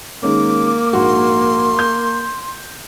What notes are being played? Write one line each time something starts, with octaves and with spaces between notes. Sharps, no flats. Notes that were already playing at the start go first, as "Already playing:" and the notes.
D#3 G#3 A#3 C#4 D6
A#1 G#2 F#4 C6
G6